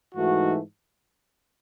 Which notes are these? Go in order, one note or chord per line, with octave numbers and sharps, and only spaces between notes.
G#2 E3 A3 D#4 F#4